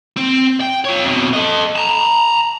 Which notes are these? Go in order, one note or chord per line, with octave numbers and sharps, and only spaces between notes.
C4
G5
F4 C#5
F2 B2
A4 D#5
A5 A#5